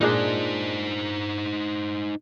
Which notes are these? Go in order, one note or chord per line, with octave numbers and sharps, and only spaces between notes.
A#2 G#3 D4 D#4 C5